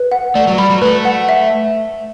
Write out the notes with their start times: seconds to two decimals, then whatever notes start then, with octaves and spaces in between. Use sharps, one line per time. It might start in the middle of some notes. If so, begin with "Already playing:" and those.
Already playing: B4
0.12 F#5
0.35 A3 D5
0.47 F#3
0.58 G3 B5
0.70 F#3
0.82 A3 B4
1.05 F#5
1.29 E5